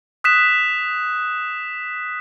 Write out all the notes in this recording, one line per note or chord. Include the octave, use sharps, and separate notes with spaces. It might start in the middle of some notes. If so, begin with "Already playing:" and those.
D#6 F#6 B6 E7